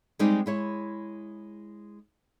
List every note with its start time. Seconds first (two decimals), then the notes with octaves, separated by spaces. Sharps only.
0.19 G3 G#3 C4 D#4 G4
0.46 G#3 E4 C#5